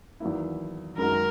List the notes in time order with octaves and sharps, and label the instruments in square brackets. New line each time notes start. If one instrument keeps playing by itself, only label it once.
[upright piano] E2 D#3 F#3 A#3 E4
[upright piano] F#2 D#3 G#3 D#4 F#4 [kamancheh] A#4